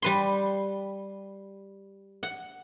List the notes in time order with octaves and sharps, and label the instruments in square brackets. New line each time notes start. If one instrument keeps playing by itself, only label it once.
[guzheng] G3 B4 C6
F#5